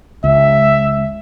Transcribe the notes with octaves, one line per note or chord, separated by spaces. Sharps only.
C#2 E5